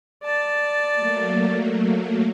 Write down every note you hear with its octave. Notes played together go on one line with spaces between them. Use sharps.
D5 A5
F#3 A3 A#3